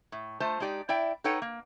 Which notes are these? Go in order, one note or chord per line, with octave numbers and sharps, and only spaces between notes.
A2
A3 F4 C5 A5
G#3 D#4 G4 D5
E4 D5 E5 G5
D#4 A4 B4 C#5 F#5 G5
A#3